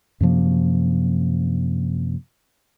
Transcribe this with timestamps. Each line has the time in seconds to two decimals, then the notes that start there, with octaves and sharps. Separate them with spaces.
0.21 F#2 C3 F3 A#3